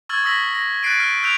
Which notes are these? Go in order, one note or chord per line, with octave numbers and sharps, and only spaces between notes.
C#6 E6 F6 G#6 A6 F#7
C#6 D#6 E6 A#6 B6 F#7
A#6
F#6 A6 B6 C7 D7 D#7
F6 B6
E6 F#6 G6 B6 D7 F7